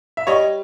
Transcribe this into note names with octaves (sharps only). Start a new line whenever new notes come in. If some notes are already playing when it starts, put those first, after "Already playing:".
E5
G3 C#5 D#5